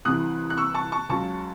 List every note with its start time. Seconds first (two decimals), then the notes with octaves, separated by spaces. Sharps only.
0.05 C2 C3 E3 D#6 F#6
0.50 F#6
0.57 C#6 E6
0.74 A5 C#6
0.92 A5 C#6
1.09 C#2 C#3 F#3 A5 C#6